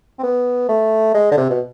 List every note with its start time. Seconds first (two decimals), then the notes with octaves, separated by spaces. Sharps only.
0.19 C4
0.23 B3
0.69 A3
1.14 G#3
1.32 D3
1.37 C3
1.50 B2